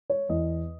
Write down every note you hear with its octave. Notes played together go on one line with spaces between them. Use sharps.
C#5
E2 D#5